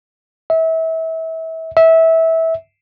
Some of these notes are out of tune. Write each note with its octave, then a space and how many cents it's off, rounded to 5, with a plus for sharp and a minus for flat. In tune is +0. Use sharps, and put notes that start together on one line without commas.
E5 -30
E5 -20